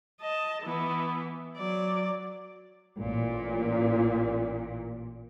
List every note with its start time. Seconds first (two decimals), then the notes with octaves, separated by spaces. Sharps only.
0.21 D#5 A5
0.63 E3 B3
1.57 F#3 D5
2.98 A1 A#2